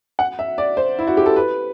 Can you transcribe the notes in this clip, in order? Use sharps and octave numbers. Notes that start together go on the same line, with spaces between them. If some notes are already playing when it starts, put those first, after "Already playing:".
F#5
E5
D5
C5
E4
F#4
G4
A4
B4